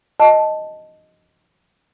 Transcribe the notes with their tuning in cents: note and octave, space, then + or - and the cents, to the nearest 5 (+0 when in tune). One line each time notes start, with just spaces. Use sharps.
D#5 +0 A5 +0